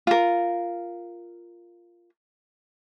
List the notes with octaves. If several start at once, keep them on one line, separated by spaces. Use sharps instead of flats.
F4 A#4